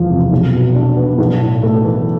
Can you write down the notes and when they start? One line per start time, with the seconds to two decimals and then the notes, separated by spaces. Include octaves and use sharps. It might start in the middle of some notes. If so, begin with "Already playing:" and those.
Already playing: E1 E2 F3
0.10 C3
0.32 B1
0.54 B2
0.75 D4
0.97 B3
1.19 B1
1.41 A2
1.63 A3
1.84 E3